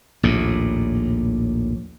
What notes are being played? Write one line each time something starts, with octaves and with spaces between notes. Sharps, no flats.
A#1 D#2 A2